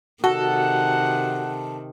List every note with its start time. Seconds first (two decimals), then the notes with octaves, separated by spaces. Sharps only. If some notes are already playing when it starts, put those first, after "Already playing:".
0.24 C3 D#3 F#4 A4 F#5